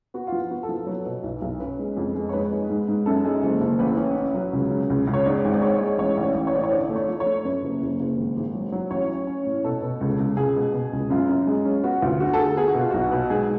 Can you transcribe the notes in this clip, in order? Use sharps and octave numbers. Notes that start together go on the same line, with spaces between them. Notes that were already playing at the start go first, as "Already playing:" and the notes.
B3 F#4
F4
F3
F#4
B3
A4
F3
F#3 B4
B2
B1
B1
C#4 B4
G#3
F2
G#3
C#5
G#2 B4
G#3
G#2
G#2
F#2 A4
G#3
F#1
F#1
A1 B4
C#4
C#4
F#3
C#2
C#3
C#2
C#2
C#5
G#2 D5
G#1
D5
G#3 C#5
G#3
A1 C#5
A1
D5
A1
C#5
A2 D5
C#5
D3 D5
A3
C#5
F3
C#5
A3
F#2 B4
F#1
F#1
F#1
G#1
G#1
F#3
F#3
A1 C#5
C#4
C#4
A2
B2 A4
B2
C#2
C#2
C#2 G#4
B2
B2
C#2
F#2 F4
F#2
G#3
C#4
B3 F#4
D2 F4
D3 F#4
A4
D3 G#4
B3 G#4
F#4
B2 F4
B1 F#4
B2
G#2 G#4